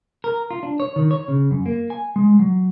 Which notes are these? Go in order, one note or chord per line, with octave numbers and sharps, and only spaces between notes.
A#4
F4
D4
C#5
D#3
C#5
C#3
F#2
A#3
G#5
G#3
F#3